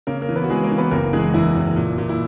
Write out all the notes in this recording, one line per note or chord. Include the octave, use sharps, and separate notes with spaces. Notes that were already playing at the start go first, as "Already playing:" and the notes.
C#3 A#3 A#4
A#3 A#4
E3
B3 B4
F#4
E3 G#3 G#4
A#3 A#4
E3
B3 B4
F#1 A#3 A#4
E3 G#3 G#4
E2 E3 E4
F#1
A#2
A#2
E4